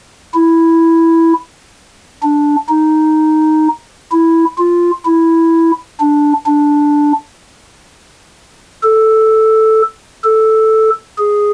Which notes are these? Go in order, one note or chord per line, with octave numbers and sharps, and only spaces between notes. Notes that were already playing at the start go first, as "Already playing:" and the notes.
E4
D4
D#4
E4
F4
E4
D4
D4
A4
A4
G#4